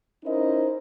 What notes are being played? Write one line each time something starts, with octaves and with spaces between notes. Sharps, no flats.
C#4 D#4 E4 A#4 C5 D#5